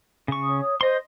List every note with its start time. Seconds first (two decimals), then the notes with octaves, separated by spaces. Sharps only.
0.28 C#3 C#6
0.42 C#5 D#6
0.81 C5 D#5 C6